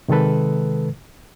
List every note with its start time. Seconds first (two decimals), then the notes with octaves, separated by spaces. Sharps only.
0.08 C3 D#3 G#3 A4 B4